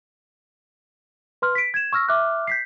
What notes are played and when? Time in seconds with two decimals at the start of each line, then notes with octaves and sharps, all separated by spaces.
1.42 B4 C6 F6
1.55 B6 D7
1.74 G#6 E7
1.93 C#6 E6 F6 A#6
2.08 E5 D6 F6 F#6
2.47 G6 B6 C7